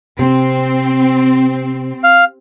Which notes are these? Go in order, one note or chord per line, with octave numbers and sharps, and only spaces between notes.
C3 C4
F5